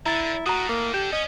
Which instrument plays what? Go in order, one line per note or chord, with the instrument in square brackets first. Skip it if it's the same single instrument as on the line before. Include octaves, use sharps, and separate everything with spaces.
[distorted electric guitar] D3 [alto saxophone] E4 [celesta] A#5 A6
[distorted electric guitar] A2 [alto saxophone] F#4 [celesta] A#5 D#6
[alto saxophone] A#3
[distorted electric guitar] D4 A4 [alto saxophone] G4 [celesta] G6 E7
[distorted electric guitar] C#4 [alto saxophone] D#5